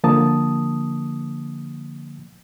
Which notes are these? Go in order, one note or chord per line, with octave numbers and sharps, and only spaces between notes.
D3 F3 A#3 A5 D#6